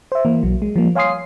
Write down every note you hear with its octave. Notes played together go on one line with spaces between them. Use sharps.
C5 E5
E3 A#3
B1 F#3
G#3
F3 G3 A#3
C#5 F5 G#5 C6 D#6 C7